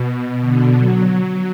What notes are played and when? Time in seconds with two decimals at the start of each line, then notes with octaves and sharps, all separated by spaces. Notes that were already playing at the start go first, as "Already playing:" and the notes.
Already playing: B2
0.41 D3
0.78 F#3